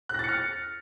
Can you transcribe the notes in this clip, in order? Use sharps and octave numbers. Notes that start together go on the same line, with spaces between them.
F6 F#6 A6 A#6 C#7